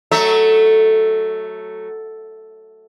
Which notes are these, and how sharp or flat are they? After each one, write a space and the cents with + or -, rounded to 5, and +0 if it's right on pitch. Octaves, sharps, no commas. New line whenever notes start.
F#3 +0 A3 +0 E5 -35